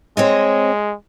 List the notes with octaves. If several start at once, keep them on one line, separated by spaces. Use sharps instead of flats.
G#3 C4 C#5 D#5